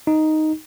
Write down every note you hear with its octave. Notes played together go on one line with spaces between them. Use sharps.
D#4